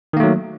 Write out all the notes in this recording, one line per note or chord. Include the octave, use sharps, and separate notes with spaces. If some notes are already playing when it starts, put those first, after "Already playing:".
D#3 F#3 A3 A#3